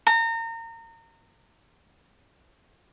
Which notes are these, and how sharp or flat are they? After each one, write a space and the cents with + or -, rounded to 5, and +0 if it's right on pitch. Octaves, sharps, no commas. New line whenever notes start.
A#5 -30